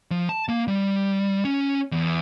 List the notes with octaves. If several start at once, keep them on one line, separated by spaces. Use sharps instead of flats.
F3
A5
A#3
G3
C#4
E2